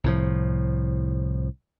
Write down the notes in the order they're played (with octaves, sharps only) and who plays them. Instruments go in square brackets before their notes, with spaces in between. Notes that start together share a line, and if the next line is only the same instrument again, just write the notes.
[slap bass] C2 A2 F3